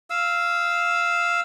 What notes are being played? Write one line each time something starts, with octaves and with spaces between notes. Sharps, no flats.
F5 E6